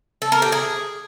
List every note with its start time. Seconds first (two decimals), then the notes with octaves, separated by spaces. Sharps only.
0.22 A4
0.32 A#4
0.42 G4
0.52 G#4